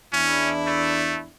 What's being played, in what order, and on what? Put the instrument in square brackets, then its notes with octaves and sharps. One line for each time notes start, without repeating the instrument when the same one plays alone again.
[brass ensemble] E2 D4 E4 [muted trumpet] C#4
[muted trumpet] A3